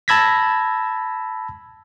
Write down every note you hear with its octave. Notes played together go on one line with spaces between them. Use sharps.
A5 B5 E6 G#6 A#6 B6